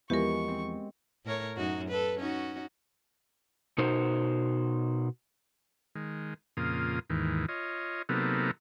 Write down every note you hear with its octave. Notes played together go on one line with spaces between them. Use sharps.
E2 E3 F3 G#3 B3 G4 A#4 C#6
C4
A2 A#4 C#5
F#2 D#4 F#4
A4 B4
C#4 D#4 F#4
B2 D#4 F#4 A#4 C5
D#3 G#3
F2 A#2 C#3 A#3 F4 D#6
D#2 G#2 D#3 E3
F4 C#5 D#5
C3 F#3 A#3 B3 D#4 A4